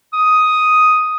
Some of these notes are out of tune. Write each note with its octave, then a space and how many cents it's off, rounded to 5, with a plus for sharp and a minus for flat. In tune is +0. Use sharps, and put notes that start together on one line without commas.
D#6 +5